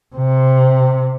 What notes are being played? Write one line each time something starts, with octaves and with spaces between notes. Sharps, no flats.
C3